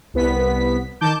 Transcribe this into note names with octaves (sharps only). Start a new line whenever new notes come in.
C2 B3 B6
D#3 A5 D6 G6